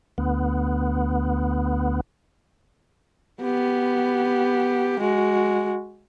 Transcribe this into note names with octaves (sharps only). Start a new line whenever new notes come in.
D2 B3
B3 G4
G#3 F#4